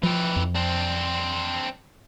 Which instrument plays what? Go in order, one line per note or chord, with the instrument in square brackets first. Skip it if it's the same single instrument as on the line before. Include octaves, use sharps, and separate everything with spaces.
[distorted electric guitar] E3 G4 [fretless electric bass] F3
[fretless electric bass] F2
[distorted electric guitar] C4 D4